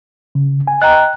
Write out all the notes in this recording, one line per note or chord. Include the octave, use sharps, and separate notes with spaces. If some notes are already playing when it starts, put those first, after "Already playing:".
C#3
G#5
D#5 G5 A#5 F#6